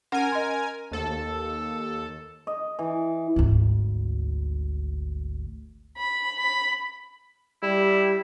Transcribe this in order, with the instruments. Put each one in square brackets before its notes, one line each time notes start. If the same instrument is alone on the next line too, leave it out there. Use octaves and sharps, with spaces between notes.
[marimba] C#4 F#5 [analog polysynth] A#4 G#5
[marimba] D#5 C6
[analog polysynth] D#2 A4
[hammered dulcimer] D#5
E3
[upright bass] G#1 D2
[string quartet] B5
B5
[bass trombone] G3 [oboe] E4